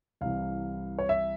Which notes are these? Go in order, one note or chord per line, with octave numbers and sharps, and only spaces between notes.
C2 C3 E3 F5
C#5
E5